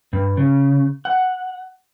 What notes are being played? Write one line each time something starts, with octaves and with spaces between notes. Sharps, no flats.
G2
C#3
F#5